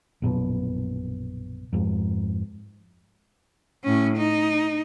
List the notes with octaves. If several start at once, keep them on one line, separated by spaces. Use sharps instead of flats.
A#1 F#2 B2
F2 G#2
A2 C#4
D#4